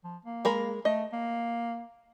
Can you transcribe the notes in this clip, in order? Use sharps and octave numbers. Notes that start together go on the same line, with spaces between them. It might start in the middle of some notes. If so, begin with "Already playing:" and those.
F3
A#3
G#3 A#4 B5
A3 D#5
A#3